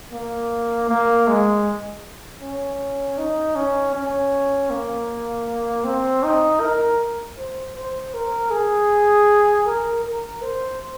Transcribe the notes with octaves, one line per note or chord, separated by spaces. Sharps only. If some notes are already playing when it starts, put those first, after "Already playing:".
A#3
A#3
G#3
C#4
D#4
C#4
C#4
A#3
C4
D#4
A#4
C5
C5
A#4
G#4
A#4
A#4
C5